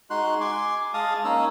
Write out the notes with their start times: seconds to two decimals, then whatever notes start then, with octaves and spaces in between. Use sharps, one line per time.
0.10 G#3 D#4 F#4 C6 F#6
0.41 G#5 C6 D6
0.94 G#3 D#5 F5 A5 D#6
1.25 A#3 C#4 D#4 C#5 E6